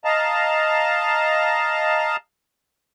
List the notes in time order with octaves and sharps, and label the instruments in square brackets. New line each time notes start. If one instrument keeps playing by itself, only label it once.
[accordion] D#5 F5 A5 A#5